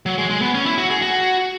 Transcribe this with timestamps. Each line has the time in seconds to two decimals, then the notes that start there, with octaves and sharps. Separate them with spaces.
0.06 F#3
0.18 G#3
0.30 G#3
0.42 B3
0.55 C#4
0.66 E4
0.78 F#4
0.90 G#4
1.02 F#4